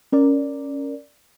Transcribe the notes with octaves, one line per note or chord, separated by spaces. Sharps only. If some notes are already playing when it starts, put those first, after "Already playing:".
C#4 A#4 D5